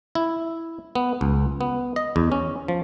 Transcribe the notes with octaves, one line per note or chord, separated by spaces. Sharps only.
E4
B3
C#2
B3
D#5
E2
C#4
F3